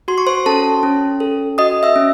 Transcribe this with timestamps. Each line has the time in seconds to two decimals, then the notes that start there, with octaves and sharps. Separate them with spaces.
0.08 F#4 C6
0.18 C#6
0.27 C5 C6
0.46 C#4 A4 A5
0.83 C#4
1.20 A4
1.58 F#4 D#5 D#6
1.83 E5 E6
1.96 C#4